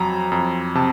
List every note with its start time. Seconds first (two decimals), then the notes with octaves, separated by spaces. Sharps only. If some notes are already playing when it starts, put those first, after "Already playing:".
Already playing: F2 F#3 A#5
0.32 F2
0.75 C3 A5